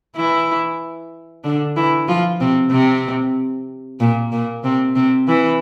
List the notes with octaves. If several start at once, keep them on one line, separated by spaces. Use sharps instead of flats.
E3 E4
D3 D4
E3 E4
F3 F4
C3 C4
C3 C4
A#2 A#3
A#2 A#3
C3 C4
C3 C4
E3 E4